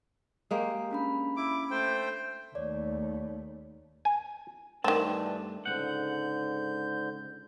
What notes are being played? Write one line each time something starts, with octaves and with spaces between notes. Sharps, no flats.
G#3 A#3 G4
C#4 D4 B5
E4 D6
A3 C5 G5
D#2 A3 C#5 D5
G#5
G2 D#3 E3 A3 C4 D4 A5
C#2 G#2 B2 D3 F#5 G6